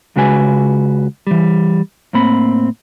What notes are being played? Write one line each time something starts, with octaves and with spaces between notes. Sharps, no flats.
C#2 C#3 G#3 F#4 B4 G#5
E3 G3
A2 A#3 C4 B5